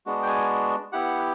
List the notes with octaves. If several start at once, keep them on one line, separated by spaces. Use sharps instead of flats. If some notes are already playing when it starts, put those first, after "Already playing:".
G#3 B3 D4 F#4
G5
G#5
B3 E4 G4 F#5